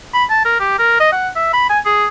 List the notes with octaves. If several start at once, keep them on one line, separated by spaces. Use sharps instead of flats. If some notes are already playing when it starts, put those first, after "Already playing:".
B5
A5
A#4
G4
A#4
D#5
F#5
E5
B5
G#5
G#4